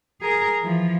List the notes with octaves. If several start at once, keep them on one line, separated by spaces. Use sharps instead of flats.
G#4 A#4
E3 F3